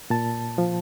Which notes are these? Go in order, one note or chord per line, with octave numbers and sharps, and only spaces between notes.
A#2 A5
F3